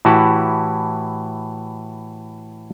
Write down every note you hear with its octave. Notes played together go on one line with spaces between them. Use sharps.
A2 E3 E4 F#4 G4 A5